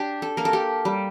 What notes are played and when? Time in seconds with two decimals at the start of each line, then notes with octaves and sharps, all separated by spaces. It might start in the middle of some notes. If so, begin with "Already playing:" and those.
Already playing: D4 G4
0.22 A4
0.37 A#3 A#4
0.45 A4
0.53 G4
0.85 G3